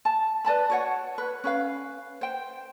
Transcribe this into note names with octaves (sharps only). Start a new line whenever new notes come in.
A5
B4 D5 A5 B5
F#4 C#5 F#5
B4 C#5
C#4 B4 F5
C5 G5